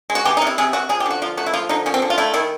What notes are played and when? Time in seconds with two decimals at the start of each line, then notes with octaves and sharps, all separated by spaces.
0.10 G#3
0.15 F#4
0.25 E3 G4
0.37 D#4
0.42 C3 E4
0.58 C3 G#4
0.73 C3 F#4
0.89 F3 G#4
1.00 G4
1.05 D3
1.11 F#4
1.22 F3 F4
1.37 A3 F#4
1.46 E4
1.53 F3 F4
1.69 D3 D#4
1.86 F3 C#4
1.94 C4
2.02 D3
2.10 F4
2.18 A3 E4
2.34 D#3 E4